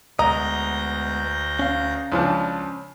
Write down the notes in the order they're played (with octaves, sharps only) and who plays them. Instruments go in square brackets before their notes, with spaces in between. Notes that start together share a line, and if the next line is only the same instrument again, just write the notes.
[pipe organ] D2 G6 A#6 [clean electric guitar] G#3 B3 D#5 [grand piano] A#5
[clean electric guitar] C#4 F5
[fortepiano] C#2 F3 D4